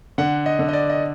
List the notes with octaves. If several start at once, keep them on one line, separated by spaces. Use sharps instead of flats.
D3 F#5
D#5
D3
D#5
D5
D#5